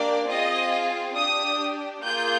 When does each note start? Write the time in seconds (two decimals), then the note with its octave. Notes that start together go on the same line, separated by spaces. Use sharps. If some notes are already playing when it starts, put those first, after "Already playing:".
Already playing: A#3 D4 G4 D5
0.28 C4 F4 G#4 D#5
1.15 D4 G4 D#6
2.02 A#3 F4 G#4 G6